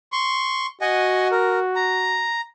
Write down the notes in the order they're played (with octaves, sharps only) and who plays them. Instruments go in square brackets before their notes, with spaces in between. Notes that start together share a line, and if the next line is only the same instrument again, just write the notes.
[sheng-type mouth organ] C6 C#6
[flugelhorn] F#4 [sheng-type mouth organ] D#5 F#5 G#5
[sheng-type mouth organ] A#4
A#5